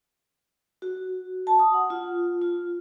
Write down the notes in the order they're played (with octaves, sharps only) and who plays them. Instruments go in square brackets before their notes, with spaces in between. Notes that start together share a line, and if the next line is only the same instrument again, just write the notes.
[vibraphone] F#4
A5
D#6
F#5
F4
F4